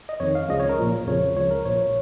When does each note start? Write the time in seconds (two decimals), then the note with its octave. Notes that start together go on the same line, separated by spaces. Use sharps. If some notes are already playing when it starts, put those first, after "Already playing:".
0.09 D#5
0.20 F2 D#3 C#5
0.35 F5
0.49 C#2 C#3 F3 D#5
0.60 C#5
0.69 A#4
0.79 A#1 A#2 F3
1.07 F2 C#3 F3 C#5
1.35 C#2 C#3 F3 C#5
1.51 A#4
1.65 A#1 A#2 F3 C#5